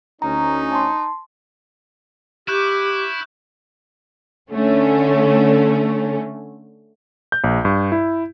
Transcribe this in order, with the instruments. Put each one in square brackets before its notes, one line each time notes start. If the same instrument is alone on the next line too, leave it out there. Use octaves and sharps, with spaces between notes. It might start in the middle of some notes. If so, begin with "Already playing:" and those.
[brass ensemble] D2 C#4 [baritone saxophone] D#4 [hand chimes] A#5
[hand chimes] A5 C6
[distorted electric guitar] E4 [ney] G4 [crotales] C#6 F#6 G6
[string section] D3 A3 C#4
[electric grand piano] G6
A#1
G2
E4